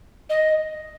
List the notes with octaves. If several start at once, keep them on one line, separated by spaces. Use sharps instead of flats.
D#5